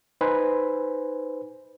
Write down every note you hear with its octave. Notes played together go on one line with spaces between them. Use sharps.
D#4 B4 C5 G#5